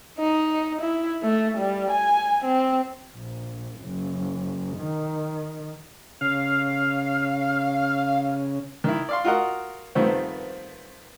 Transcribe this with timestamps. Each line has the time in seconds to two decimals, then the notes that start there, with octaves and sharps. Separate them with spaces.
0.19 D#4
0.81 E4
1.23 A3
1.58 G3
1.91 G#5
2.45 C4
3.16 A#1
3.81 F#1
4.77 D#3
6.21 C#3 F5
8.84 D#3 E4
9.09 D5 F5 C6
9.24 F4 F#4 A#4 D#5 F#5
9.95 G2 D#3 F3 A3 B3 C4